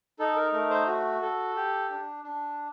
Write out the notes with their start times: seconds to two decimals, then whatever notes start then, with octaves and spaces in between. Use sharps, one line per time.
0.19 D#4 A4
0.36 A#4
0.52 A3 A#4
0.70 C5
0.87 F#4
1.22 A4
1.56 G4
1.90 D4
2.24 D4